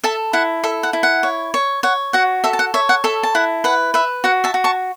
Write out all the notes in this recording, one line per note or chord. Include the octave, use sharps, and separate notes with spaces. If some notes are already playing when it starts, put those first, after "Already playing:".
A4 E5 A5
E4 F#5
A4 E5
F#5
E4
F#5
C#5
C#5
C#5 F#5
F#4 F#5
A4 E5
A5
F#5
C#5 E5
F#5
A4 E5
A5
E4 F#5
B4 F#5
B4 E5
F#4 F#5
E5 A5
F#4
A5 C#6